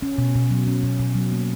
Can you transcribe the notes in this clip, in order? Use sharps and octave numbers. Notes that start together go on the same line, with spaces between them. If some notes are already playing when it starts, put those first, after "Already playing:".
C#4
B2
B2
F#3
C#4
B2
B2
F#3
A#3